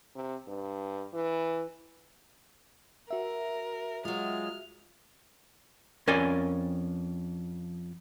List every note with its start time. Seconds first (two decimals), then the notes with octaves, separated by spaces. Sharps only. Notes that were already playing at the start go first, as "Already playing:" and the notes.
0.16 C3
0.48 G2
1.13 E3
3.11 F#4 A#4 E5
4.05 F#3 G#3 F4 F6
6.07 F2 C#4 A#4 D5 G#5